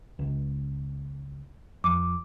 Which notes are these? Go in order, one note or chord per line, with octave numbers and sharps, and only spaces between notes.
C#2
F2 D6